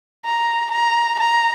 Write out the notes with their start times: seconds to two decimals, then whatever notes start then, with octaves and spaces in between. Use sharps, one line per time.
0.25 A#5
0.72 A#5
1.19 A#5